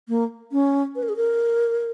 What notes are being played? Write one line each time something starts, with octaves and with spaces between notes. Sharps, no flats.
A#3
C#4
B4
A#4
G#4
A#4